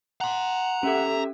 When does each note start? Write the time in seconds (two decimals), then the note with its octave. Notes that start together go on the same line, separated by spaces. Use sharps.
0.21 F#5 A#5 C6
0.83 C#4 G4 A4 E5